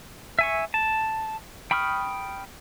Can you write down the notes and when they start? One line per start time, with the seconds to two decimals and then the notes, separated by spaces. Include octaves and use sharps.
0.39 E5 G#5 C#6
0.74 A5
1.71 G5 B5 C#6 D#6 F6